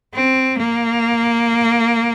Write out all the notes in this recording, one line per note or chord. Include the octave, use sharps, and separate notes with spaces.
C4
A#3